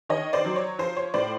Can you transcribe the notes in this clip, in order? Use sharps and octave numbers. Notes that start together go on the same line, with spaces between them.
D#3 C#5 D#5
C5 D5
F#3
C#5
F3 C5
C#5
A2 C5 D5